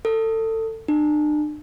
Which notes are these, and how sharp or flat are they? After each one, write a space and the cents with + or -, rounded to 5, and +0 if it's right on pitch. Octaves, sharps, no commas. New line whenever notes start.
A4 +25
D4 +40